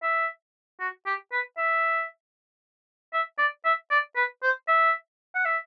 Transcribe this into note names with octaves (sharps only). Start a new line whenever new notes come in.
E5
F#4
G4
B4
E5
E5
D5
E5
D5
B4
C5
E5
F#5
E5